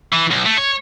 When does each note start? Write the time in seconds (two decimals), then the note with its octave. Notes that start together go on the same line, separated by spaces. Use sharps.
0.13 E3
0.31 B1
0.46 A3
0.58 C#5